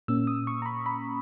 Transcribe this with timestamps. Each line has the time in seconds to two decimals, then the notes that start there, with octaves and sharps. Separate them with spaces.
0.08 A#2 A#3 C#4 E6
0.27 D#6
0.47 C#6
0.62 A#5
0.66 B5
0.86 B5